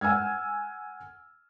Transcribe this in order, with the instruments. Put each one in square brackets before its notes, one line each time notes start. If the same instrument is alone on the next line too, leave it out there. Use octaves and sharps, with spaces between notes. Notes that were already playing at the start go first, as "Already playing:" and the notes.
[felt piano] F#5 G#5 E6 F6 G#6